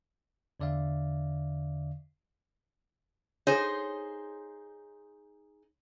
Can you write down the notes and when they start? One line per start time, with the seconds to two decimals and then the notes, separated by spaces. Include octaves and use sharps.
0.60 E2 D3 D5 E5 F5
3.47 D#4 G#4 A4 C5 C#5